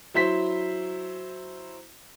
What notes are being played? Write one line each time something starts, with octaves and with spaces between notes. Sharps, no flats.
F#3 E4 C5 B6